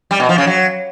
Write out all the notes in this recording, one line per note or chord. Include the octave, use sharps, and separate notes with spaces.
G3
B2
F3
C#3
F#3